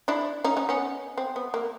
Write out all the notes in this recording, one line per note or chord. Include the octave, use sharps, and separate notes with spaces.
D4 E4
C#4 D#4
C#4 D#4
B3 C#4
C4
B3
A#3